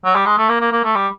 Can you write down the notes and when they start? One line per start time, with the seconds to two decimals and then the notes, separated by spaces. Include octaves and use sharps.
0.05 F#3
0.15 G3
0.26 G#3
0.38 A3
0.49 A#3
0.61 A#3
0.72 A#3
0.84 A3
0.95 G3